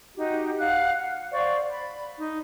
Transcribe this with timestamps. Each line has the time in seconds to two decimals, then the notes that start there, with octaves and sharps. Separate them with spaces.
0.16 D#4 F#4 G4
0.58 F5 F#5 F#6
0.95 F#5
1.33 C5 D5 F5 C#6
1.71 B5
2.19 D#4